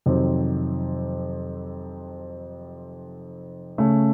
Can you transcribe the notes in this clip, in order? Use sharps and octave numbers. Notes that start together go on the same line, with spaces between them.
F2 C3 D#3 F#3 C4
C#3 A3 C#4